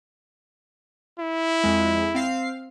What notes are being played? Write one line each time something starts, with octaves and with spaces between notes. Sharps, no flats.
E4
F2 G#3
C4 F5 C7